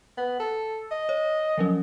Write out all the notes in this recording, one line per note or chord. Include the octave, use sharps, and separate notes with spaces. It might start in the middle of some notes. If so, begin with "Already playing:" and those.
B3
A4
D#5
C#5
F3 F#3 C#4